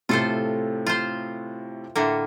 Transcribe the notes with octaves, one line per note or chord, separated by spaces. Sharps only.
A2 C3 A3 F4 A4 C5
F4 C5
A2 D3 A#3